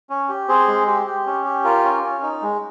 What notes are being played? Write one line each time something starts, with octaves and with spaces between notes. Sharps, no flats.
C#4
G4
C4 G#4 C5
G#3
G4
G4
C#4
G4
F4 A#4
C#4
C#4
D#4
G#3